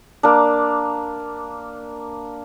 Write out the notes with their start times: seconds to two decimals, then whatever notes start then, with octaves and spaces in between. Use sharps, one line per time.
0.23 A#3 D4